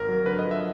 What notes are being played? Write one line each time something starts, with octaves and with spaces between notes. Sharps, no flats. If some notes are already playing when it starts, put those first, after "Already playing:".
Already playing: G#1 A#4
F#3
D3 B4
D#5
F3
E5